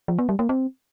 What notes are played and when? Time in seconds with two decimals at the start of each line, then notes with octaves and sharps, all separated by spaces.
0.08 F3
0.18 B3
0.29 G3
0.39 A#3
0.49 C4